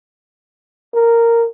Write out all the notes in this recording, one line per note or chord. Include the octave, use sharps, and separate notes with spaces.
A#4